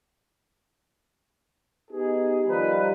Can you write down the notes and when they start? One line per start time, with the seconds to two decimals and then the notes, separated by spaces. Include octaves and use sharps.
1.91 B3 D#4 G4 G#4
2.47 D#3 F3 G3 A#4 B4